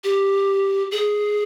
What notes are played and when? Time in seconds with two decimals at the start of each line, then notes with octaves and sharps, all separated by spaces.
0.04 G4
0.91 G#4